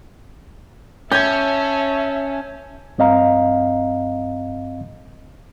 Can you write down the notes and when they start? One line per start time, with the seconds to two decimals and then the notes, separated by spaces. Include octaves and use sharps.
1.12 C#4 E5 A5 G6 G#6
2.98 G2 C4 D#5 F5 A#5